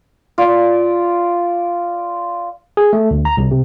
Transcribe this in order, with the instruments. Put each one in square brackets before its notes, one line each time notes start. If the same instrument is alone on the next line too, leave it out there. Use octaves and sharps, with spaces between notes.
[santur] F4 D5
[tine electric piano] G#4
A3
D2
A#5
C2
C3